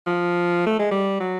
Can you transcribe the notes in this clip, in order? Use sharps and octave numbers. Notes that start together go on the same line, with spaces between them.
F3
A3
G#3
G3
F#3